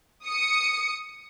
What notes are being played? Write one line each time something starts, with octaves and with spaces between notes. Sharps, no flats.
D#6 C#7